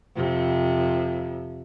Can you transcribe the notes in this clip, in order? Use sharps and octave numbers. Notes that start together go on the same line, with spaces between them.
F2 C3